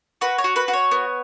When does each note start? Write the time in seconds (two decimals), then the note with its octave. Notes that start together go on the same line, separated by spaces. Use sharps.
0.21 F#4 B4
0.38 C#5
0.44 F#4
0.56 B4
0.68 F#4
0.73 C#5
0.91 B3